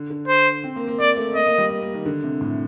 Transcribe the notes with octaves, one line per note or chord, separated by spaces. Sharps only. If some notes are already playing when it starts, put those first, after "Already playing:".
Already playing: D3
D3
C5
C4
A#3
A#3
A#3 D5
A3
A#3 D#5
A#3
G3
A#3
A#3
D#3
D3
C3
A2